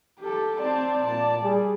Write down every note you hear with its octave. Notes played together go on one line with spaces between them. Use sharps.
G4 A4
C4 D5 A5
A#2 A5
G3 G#4